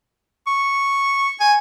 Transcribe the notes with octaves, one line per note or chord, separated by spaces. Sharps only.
C#6
G#5